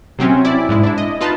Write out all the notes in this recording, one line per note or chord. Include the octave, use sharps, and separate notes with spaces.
C3 F#3 C4 C#4
E4 D5
G#2 G#3 E4
D4 E4
D#5
D#4 F4 B4 A5